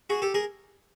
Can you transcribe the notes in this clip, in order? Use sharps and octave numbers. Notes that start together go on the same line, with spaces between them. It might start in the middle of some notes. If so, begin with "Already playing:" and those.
F#4 G#4
G4 A4
G#4 A#4